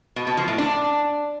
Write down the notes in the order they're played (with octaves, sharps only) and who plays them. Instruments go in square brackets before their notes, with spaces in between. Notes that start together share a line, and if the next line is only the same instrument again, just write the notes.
[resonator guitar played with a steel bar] B2
B2
F3
A2
D4